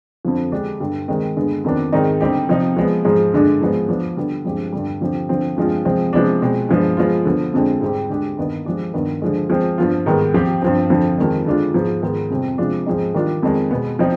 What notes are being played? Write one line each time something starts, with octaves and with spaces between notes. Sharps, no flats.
F2 D3 F3
D3 G#3 D4 G4
G2 D3 G3
D#3 G#3 C4
G2 D3 G#3 B3
F2 D#3 B3 D4
G#2 D#3 G#3 C4 D#4
D3 G3 C4 D#4 G4
C3 F3 C4 D#4
F3 G#3 B3
G#2 F3 G#3
G2 D3 G#3 D4
G#2 F3 G#3 B3
F3 B3 D4
D3 G3 B3
G2 F3 G#3 C4 G4
G2 D3 G3
D3 F3 C4 G4
D3 F3 C4
G2 F3 G#3 C4 F4
C3 F3 G#3 C4
C3 F3 G#3 B3 D4
B2 G#3 C4
G2 F3 G#3 B3
F3 G#3 B3 F4
D3 F3 B3
F2 D3 G#3 C4
G#2 G3 C4 G4
D3 G#3 D4 G4
G2 D#3 B3 D#4
F3 G#3 D4 G4
G2 D#3 B3
D3 F3 G#3
F3 G#3 C4
G2 F3 B3 F4
G#2 D#3 G3 B3
F3 C4 G4
G2 F3 C4
F2 D3 F3 C4
F2 D#3 G#3
D3 G#3 D4 F4
G#2 F3 B3
G#2 D#3 B3
F2 C3 G3 C4
C3 F3 G#3 D4 F4
G#2 F3 G#3 C4 D#4
D#3 G3 D4 F4
F2 D#3 G#3
B2 G#3 B3
F3 C4 D#4